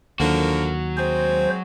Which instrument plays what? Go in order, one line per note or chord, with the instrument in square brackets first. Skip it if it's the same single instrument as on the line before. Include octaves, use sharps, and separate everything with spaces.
[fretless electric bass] D#2 [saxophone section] D3 F3 A#4 [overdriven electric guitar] F#3 F#4
[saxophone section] G#3 C4 G#4 [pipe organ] C5